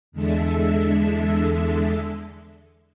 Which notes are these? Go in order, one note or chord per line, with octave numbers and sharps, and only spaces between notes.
E2 D3 G#3 A4 E5